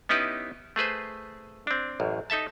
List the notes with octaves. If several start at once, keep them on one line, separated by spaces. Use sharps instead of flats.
B3 C#4 D#4 E4 G4 B4
A3 G#4 B4 C5
C4 D4
A1 F#2
D#4 A4 E5 A5